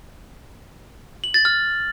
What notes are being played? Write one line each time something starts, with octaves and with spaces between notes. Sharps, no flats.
F#7
A6
F6